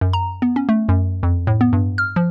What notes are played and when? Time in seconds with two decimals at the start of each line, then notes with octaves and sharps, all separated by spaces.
0.01 F#2
0.13 A#5
0.42 B3
0.56 C#4
0.69 A3
0.89 F#2
1.23 F2
1.47 A2
1.61 B3
1.73 G2
1.98 F6
2.16 F3